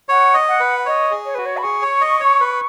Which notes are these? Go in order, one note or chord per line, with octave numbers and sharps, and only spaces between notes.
C#5 F#5
D#5
F#5
B4
C#5 D#5
G#4
C#5
F#4 B4
C#5
B5
G#4 C#6
C#5
D#5
C#5
B4